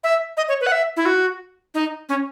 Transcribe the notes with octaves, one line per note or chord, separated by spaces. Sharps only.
E5
D#5
C#5
B4
F#5
E5
E4
F#4
D#4
C#4